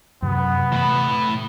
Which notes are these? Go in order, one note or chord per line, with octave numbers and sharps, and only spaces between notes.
F#2 C3 B3
A2 E3 B5